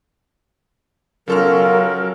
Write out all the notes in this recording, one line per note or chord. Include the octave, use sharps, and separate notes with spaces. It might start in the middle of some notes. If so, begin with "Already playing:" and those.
B1 C#3 F#3 C#4 F4 A4 A#4 F6